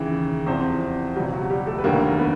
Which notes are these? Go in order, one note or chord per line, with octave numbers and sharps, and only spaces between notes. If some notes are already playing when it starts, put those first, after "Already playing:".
Already playing: D#2 C#3 E3
E2 C3 F3 C4 C5
C#2 B2 F#3 G3 G4
F#3 F#4
G3 G4
A3 A4
B4
F1 D#2 D3 F#3 A#3 A#4
B3 B4